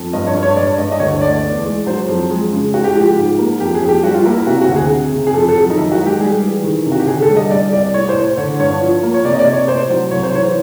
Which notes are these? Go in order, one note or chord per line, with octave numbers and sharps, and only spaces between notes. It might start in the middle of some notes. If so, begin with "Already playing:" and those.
Already playing: F2
G2 D#5
C#5
G2
C#5
G2 D5
G2 D#5
D#5
D2 C#5
A3 D5
E2
G#3
F#3 C5
F2
G#3
C#3
G#3 F#4
G4
F3 G4
G#2
A#3
F2 G4
G#4
F2
G4
G3 F#4
F4
A#3 E4
E4
C3 F#4
F#4
D2
G#4
C3
C3
G#4
F2 A4
A4
F#3
D#4
D#3 E4
F#4
G#3
G4
G3 G#4
E3
D#3
C3
F#4
G4
D3 G#4
A4
G3
D#5
G3 D5
C2 D5
A2 C#5
C5
A2
D3 C#5
G2 C#5
F3
A#3
C#5
C3 D5
D#5
D5
C3
C#5
A2 C5
F#3
C2 C#5
C5
E3 C#5